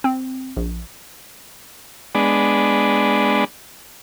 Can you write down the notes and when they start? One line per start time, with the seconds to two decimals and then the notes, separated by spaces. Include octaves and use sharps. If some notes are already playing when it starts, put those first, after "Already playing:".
0.04 C4
0.57 A#1
2.15 G#3 B3 D4